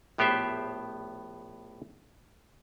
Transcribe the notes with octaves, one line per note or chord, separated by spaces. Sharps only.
A#1 A2 B3 G4 C5 E5